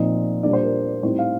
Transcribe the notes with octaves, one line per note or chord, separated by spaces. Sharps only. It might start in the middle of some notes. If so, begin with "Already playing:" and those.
Already playing: A#2 F3 C4 D#4 D#5
A#2 G3 A#3 D4 D5
C5
A#4
A2 G3 C4 D#4 C5
F5